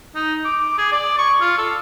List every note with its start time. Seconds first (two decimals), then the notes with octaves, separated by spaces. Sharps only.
0.15 D#4
0.45 D6
0.78 G#4
0.92 D5
1.18 C#6
1.41 F4
1.58 A4